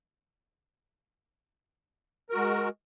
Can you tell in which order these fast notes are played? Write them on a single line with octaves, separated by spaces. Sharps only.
A#4 F#4 G#3